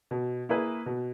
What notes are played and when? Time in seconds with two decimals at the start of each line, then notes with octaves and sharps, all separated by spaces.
0.11 B2
0.49 A#3 E4 G#4 B4
0.86 B2